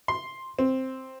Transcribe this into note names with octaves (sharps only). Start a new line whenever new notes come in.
C6
C4